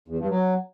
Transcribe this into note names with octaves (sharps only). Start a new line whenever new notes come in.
E2
G2
F#3